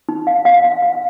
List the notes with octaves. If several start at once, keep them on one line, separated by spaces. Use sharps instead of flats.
D#4
F5
F5
F5
F5